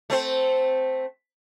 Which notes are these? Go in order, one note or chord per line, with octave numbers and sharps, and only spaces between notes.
A3 C4 C5